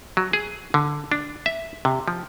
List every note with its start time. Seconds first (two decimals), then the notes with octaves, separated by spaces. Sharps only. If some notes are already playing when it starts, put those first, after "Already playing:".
0.17 F#3
0.33 G#4
0.74 D3
1.12 D4
1.46 E5
1.85 C3
2.08 F3